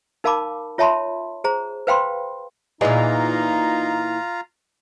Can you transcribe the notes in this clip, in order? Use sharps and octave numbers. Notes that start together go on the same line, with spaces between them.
D#4 A#4 F5 A5 B5 D6
F4 C#5 E5 A5 B5 C6
G#4 C5 A#5
B4 C5 F5 G5 B5 C6
A#2 E3 D#4 F4 G#4 D#5 F5 A#5